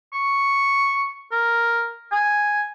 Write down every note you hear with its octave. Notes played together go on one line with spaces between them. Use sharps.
C#6
A#4
G#5